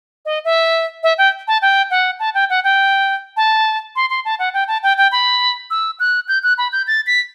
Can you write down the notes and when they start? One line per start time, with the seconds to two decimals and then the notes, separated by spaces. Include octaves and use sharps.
0.25 D#5
0.45 E5
1.03 E5
1.18 G5
1.48 A5
1.62 G5
1.91 F#5
2.20 A5
2.34 G5
2.50 F#5
2.64 G5
3.37 A5
3.96 C6
4.10 C6
4.25 A5
4.39 F#5
4.54 G5
4.68 A5
4.83 G5
4.97 G5
5.12 B5
5.70 E6
6.00 F#6
6.28 G6
6.43 F#6
6.58 B5
6.72 G6
6.87 A6
7.07 B6